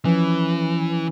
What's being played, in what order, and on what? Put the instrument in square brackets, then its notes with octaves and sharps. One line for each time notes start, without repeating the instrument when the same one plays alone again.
[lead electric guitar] E3 [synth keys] F3 [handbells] C#4 B4